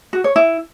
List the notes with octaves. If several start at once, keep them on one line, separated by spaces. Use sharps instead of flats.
F#4
C#5
E4